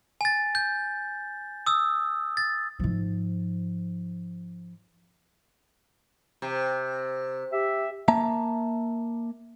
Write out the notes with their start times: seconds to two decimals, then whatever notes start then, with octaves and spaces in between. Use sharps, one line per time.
0.21 G#5 A6
0.55 G6
1.66 D#6 E6
2.37 A6
2.80 G#2 F3
6.42 C3
7.51 G4 E5
8.08 A#3 E5 A5 A#5